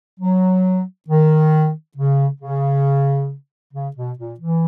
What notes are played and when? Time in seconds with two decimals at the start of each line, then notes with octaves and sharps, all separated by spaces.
0.20 F#3
1.09 D#3
1.97 C#3
2.41 C#3
3.74 C#3
3.96 B2
4.18 A#2
4.40 E3